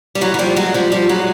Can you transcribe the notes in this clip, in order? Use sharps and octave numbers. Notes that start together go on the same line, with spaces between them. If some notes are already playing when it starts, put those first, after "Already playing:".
G3
E3 F#3
F#3
F3 G3
F#3 G#3
F3 G3
F3 G3
F#3 G#3